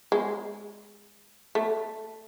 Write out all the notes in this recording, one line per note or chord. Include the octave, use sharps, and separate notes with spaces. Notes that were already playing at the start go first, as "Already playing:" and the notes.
G#3
A3